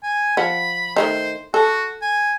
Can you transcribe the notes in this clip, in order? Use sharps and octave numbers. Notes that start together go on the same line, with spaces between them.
G#5
F3 F#5 B5
D#3 A3 D#4 C5
F#4 A4
G#5